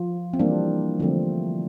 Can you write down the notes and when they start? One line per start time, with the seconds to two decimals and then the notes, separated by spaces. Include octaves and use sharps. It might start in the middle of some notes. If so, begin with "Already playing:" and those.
Already playing: F3 F4
0.34 C4
0.39 E3 G3 A#3 D4
1.00 D3 F3 A3 C4